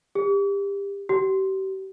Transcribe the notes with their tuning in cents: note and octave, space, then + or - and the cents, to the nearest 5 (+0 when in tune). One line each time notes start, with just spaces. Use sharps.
G4 +30
G4 -40